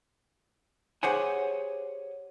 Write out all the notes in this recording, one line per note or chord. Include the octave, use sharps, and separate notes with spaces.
G4 G#4 C5 C#5 F#5 G#5